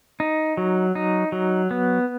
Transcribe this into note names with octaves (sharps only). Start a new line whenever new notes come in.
D#4
F#3
D#4
F#3
B3